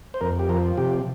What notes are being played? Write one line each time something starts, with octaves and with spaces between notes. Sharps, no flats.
C5
F2 A#4
G4
F3 A#4
C3 G4